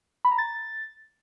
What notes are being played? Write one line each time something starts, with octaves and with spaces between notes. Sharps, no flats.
B5
A#5
A6